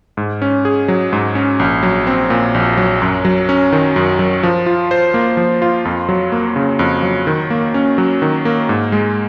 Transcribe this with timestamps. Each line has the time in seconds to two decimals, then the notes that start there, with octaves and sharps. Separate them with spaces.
0.17 G#2
0.42 C#4
0.65 G#4
0.88 F#3
1.13 G#2
1.35 C#4
1.59 A#1
1.83 F#3
2.07 C4
2.30 A#2
2.54 A#1
2.77 F#3
3.02 F#2
3.25 F#3
3.49 C#4
3.72 D#3
3.96 F#2
4.19 F#3
4.43 F3
4.66 F4
4.91 C5
5.14 A#3
5.37 F3
5.62 F4
5.85 F2
6.09 F#3
6.32 A#3
6.56 C#3
6.79 F2
7.03 F#3
7.27 D#3
7.50 A#3
7.74 C#4
7.98 F#3
8.22 D#3
8.45 A#3
8.69 G#2
8.92 G#3